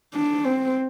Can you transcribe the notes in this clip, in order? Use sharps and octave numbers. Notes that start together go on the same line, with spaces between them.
D4
C4